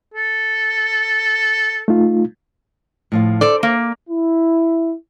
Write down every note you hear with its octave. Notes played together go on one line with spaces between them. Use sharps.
A4
A3 D#4 F4
A2 F3 F5
A4 C5 D5
A#3
E4